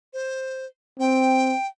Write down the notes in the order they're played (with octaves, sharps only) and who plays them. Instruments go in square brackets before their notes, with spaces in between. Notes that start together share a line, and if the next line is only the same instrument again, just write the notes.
[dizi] C5
[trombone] C4 [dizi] G5